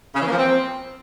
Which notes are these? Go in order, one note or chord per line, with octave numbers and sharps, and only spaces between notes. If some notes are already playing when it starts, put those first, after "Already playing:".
C#3
E3
A#3
F3
C4